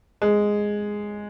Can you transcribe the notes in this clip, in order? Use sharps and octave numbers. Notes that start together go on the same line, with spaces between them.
G#3